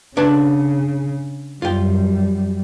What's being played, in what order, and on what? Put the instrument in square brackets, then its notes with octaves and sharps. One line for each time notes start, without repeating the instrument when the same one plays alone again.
[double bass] C#3 [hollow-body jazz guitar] D4 B4 A5
[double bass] F#2 G3 [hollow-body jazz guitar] F4 G5